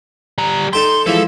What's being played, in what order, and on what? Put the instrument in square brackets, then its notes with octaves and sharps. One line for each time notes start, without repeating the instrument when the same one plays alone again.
[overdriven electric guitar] G3 A#5
[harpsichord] D#4 A4 G5 [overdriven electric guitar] C6
[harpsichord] E3 F3 G#3 [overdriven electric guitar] A4